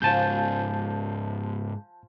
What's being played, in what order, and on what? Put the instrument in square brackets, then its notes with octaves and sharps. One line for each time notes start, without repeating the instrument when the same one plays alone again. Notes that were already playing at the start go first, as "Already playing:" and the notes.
[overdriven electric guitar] G#2 C#3 [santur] F3 G#5 [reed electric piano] A5 G6